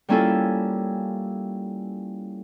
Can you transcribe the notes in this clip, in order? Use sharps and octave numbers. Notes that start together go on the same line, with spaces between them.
G3 A#3 C#4 E4 F4 A4